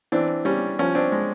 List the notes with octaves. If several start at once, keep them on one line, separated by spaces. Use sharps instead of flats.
E3 C4 D4
G3 C#4
F3 C#4
C4 D4
G#3